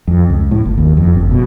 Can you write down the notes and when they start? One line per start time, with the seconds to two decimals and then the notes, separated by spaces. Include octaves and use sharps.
0.08 F2
0.30 C#2
0.51 A2
0.65 G1
0.78 D#2
0.97 F2
1.14 G1
1.31 B2